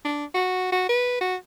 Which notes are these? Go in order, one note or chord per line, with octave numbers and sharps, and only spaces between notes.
D4
F#4
F#4
B4
F#4